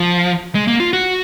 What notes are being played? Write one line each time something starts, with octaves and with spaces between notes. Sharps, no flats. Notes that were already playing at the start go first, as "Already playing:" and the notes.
Already playing: F3
G#3
A#3
F4
F#4